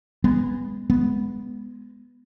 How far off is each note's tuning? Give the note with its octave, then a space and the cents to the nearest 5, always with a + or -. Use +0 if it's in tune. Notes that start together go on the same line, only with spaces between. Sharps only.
G#3 -25 B3 +0
G#3 +0 B3 +0